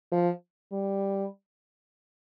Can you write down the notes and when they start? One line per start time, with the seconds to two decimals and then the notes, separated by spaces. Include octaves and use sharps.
0.12 F3
0.72 G3